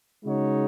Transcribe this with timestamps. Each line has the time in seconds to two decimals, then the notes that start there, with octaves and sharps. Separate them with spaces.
0.25 C#3 G#3 D#4 F#4 C#5